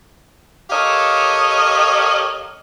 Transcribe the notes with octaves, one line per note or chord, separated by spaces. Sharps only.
G4 A4 A#4 C#5 D#5 F5